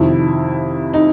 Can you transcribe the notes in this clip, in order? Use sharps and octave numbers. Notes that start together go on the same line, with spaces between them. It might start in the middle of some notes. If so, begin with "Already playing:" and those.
Already playing: F2 C3 D#3 E4
D#4